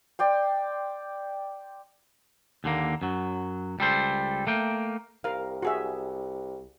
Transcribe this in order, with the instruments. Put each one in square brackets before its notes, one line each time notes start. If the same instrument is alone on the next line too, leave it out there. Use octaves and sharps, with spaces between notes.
[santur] D5 G5 C6
[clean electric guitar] D#2 D3 A#3
F#2 F#3
C#2 G3 A4 C5
A3 A#3 G5
[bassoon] C2 [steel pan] A#4 F5
[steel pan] F#4 G#4 E5